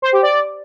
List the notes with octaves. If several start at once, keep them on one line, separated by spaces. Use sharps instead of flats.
C5
G4
D5